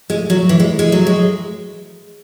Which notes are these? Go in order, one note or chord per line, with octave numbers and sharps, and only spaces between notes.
G#3
F#3
E3
G#3
G#3
F#3
G#3